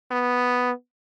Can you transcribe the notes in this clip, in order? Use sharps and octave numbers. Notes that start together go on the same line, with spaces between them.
B3